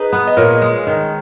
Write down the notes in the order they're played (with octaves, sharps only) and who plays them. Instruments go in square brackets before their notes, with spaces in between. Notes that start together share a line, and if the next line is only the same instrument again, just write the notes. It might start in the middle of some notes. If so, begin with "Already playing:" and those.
Already playing: [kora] D#4 [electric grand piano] G#4 B4
[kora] B3
[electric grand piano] D#5
[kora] A#2 [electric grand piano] A#4 C#5
[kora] G#3
D#3